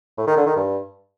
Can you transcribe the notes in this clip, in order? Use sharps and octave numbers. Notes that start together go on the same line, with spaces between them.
A2
D#3
D3
D#3
G2